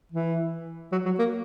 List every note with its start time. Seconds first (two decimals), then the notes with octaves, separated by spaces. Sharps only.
0.12 E3
0.92 F#3
1.06 F#3
1.19 A#3